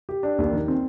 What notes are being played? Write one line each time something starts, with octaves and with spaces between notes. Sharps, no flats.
G4
D4
D#2
D#3
C4